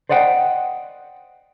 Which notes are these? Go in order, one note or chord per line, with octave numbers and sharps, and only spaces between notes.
C5 D5 D#5 F#5 G5